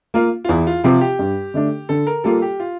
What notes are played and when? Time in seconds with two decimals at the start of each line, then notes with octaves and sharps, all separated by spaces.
0.14 A#3 F4
0.45 F4
0.49 E2 E4
0.67 F4
0.84 C3 F3 C4 F4
1.01 G4
1.19 G2
1.54 D3 A3 D4
1.89 D3 A4
2.07 A#4
2.24 G3 A#3 F4 A4
2.42 G4
2.60 F4